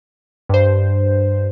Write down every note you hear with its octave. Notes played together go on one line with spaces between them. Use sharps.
G2 C5